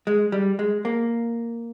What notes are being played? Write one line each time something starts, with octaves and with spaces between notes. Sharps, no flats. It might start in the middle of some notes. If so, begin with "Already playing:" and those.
G#3
G3
G#3
A#3